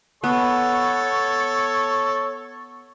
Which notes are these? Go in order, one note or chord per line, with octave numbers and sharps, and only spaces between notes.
B3 A4 C#5 C#6